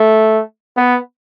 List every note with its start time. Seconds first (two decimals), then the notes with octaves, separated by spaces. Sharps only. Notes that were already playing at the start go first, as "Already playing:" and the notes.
Already playing: A3
0.77 B3